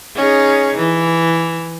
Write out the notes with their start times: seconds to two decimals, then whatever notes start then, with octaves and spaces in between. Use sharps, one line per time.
0.16 C#4 D#4 G#4
0.77 E3